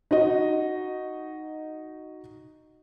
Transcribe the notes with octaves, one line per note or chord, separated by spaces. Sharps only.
D#4 F#4 D#5